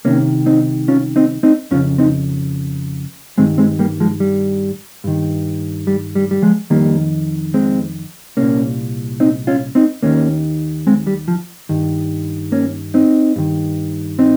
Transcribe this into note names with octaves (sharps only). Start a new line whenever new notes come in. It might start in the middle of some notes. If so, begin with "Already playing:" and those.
C2 C3 D#3 A#3 C#4
C4 D#4
C#4 F4
C4 D#4
C4 D#4
F2 C#3 C#4 F4
C4 D#4
G2 D#3 G#3 C4
G#3 C4
G3 A#3
F3 G#3
G3
G2 D#3
G3
G3
G3
F3 G#3
F2 D#3 G3 A#3
G#3 C4
C2 A#2 A#3 C#4
C4 D#4
C#4 F4
C4 D#4
D#2 D#3 A#3 C#4
G#3 C4
G3
F3
G2 D#3
A#3 C#4
C4 D#4
G2 D#3
C4 D#4